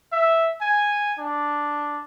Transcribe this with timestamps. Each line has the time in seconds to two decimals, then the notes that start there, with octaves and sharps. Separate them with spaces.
0.12 E5
0.61 G#5
1.19 D4